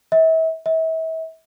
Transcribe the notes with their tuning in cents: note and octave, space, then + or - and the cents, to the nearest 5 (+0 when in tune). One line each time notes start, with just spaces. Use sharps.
E5 -35
E5 -35